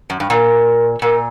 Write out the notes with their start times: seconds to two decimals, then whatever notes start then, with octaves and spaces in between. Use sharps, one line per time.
0.10 F#2
0.20 G2
0.30 A#2 A#4
1.02 A#2 A#4